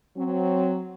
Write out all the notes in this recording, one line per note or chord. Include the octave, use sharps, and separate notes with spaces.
F#3 C4